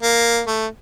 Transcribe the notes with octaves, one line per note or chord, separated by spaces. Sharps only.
A#3
A3